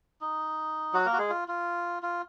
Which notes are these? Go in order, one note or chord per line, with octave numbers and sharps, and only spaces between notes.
D#4
F#3 F#4
A#3 A#4
F#4
G#3 G#4
F4
F4
F4